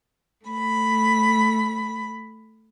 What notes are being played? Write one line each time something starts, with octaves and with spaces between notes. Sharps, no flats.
A3 B5